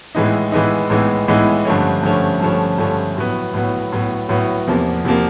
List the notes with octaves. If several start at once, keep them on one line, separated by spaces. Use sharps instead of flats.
A2 E3 G#3 B3 D#4
A2 E3 G#3 B3 D#4
A2 E3 G#3 B3 D#4
A2 E3 G#3 B3 D#4
G2 D3 F3 A3 C#4
G2 D3 F3 A3 C#4
G2 D3 F3 A3 C#4
G2 D3 F3 A3 C#4
A2 F#3 B3
A2 F#3 B3
A2 F#3 B3
A2 F#3 B3
E2 C3 F3 A#3
E2 C3 F3 A#3